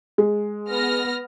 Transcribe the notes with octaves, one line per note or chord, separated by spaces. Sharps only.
G#3
B3 F6 A#6